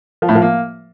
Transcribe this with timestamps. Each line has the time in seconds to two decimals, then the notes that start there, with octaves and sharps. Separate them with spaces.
0.22 F3
0.29 A2
0.35 F3
0.42 A#3